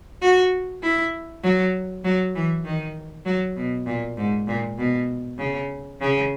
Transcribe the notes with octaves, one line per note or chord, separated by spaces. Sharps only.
F#4
E4
F#3
F#3
E3
D#3
F#3
B2
A#2
G#2
A#2
B2
C#3
C#3